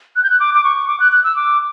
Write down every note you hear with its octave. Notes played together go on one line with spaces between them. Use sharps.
F#6
G6
F#6
D6
D6
C#6
D6
F#6
F#6
E6
D6